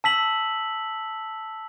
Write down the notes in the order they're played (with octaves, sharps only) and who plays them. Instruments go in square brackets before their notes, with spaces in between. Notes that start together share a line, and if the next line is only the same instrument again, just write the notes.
[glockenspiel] A5 E6 B6 F#7